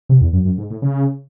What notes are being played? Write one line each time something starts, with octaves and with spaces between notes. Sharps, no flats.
C3
E2
F#2
F#2
G#2
A2
C#3